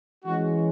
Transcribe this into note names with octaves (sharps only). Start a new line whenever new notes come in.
E3 G#3 C#4 F#4